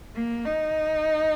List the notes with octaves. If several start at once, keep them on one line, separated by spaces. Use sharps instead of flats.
A#3
D#4